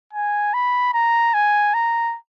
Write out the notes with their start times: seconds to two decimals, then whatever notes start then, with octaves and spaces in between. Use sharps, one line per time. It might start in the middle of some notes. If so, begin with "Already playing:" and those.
0.13 G#5
0.54 B5
0.94 A#5
1.34 G#5
1.74 A#5